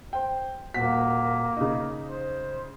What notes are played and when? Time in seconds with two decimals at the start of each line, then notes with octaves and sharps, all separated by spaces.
0.13 C5 G5
0.74 D#1 A#3 F#4 B6
1.57 C#3 D#4
2.04 C5